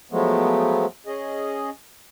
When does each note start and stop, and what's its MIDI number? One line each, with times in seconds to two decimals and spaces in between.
0.11 0.86 53
0.11 0.86 54
0.11 0.86 56
0.11 0.86 57
0.11 0.86 59
1.06 1.70 61
1.06 1.70 68
1.06 1.70 75